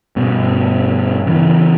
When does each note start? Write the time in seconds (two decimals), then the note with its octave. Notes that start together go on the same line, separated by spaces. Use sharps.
0.16 G2 B2
1.27 C#3 E3